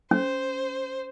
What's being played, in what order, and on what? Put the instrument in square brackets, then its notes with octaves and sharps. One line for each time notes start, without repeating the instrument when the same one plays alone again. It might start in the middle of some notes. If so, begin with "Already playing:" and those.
[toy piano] C#4 [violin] C5